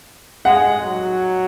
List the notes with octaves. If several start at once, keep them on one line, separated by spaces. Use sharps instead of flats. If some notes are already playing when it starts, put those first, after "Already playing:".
G#3 F#5
F#3